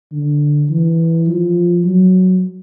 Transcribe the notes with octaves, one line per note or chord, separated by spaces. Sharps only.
D3
E3
F3
F#3